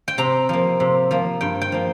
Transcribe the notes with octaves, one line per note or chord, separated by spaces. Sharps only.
G5
C3 A#5
F3 A#3
C3
F3 A#3
G2 G5
G5
F3 A#3